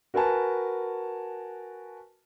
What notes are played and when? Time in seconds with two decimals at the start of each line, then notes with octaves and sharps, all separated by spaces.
0.14 F#4 A#4 B4 G#5 A5